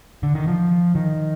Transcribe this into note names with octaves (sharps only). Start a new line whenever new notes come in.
D3
D#3
F3
D#3